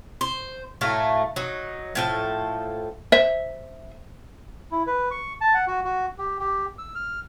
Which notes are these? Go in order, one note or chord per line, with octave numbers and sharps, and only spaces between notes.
C5
A2 F#3 A3 F5
F#3 D#4
A2 F3 A4
C5 E5
E4
B4
C#6
A5
F#5
F#4
F#4
G4
G4
E6
F6